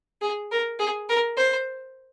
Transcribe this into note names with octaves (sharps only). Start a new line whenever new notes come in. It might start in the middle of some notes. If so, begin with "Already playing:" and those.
G#4
A#4
G#4
A#4
C5